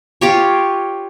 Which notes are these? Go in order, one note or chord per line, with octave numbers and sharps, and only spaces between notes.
F4 G4 C#5